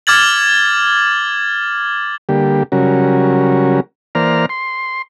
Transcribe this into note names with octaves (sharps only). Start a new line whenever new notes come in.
D6 F6 G#6 A6 F#7
D3 G3 A#3 G4
C#3 F#3 G3 C#4 F#4 A#4
E3 A#3 C5 D5 A#5 F6
C6